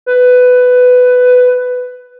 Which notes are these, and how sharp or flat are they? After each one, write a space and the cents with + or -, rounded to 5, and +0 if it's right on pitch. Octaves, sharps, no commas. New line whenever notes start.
B4 +15